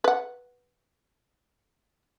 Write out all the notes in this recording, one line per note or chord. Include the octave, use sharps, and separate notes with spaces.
B4 F#5